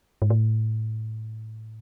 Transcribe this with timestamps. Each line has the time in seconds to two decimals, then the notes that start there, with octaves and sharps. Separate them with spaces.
0.22 G#2
0.30 A2